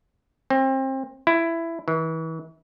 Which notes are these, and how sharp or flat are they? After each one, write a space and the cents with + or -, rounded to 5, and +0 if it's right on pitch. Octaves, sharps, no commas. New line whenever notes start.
C4 +30
E4 +10
E3 -35